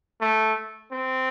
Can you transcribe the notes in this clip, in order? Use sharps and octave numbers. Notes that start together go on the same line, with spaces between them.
A3
C4